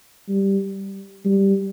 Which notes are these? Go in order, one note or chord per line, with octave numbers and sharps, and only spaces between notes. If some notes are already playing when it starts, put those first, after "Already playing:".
G3
G3